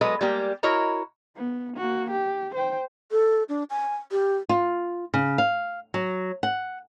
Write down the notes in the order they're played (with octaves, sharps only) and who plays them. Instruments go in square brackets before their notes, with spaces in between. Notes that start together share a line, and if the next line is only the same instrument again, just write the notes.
[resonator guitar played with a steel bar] F#3 G#3 A4 B4 D#5
G3 G#3 A#3 G4
E4 F#4 A#4 C#5 D#5 A#5
[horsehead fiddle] B3
A#3 F#4
G4
C5 G5
[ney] A4
D4
G#5
G4
[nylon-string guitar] F4
C#3
F5
F#3
F#5